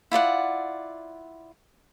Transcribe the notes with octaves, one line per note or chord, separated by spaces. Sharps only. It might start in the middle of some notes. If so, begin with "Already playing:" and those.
E4 F4 D5 F#5